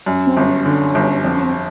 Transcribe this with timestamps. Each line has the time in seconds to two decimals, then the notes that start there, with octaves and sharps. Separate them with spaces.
0.06 F#2
0.27 C4
0.37 G1
0.46 C#4
0.65 D3
0.95 G1
1.24 F2 C4
1.35 C#4
1.43 C4